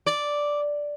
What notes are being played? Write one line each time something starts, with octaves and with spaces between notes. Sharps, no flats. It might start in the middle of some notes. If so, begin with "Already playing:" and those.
D5